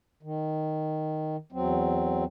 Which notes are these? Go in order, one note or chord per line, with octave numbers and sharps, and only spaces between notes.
D#3
E2 F#3 C4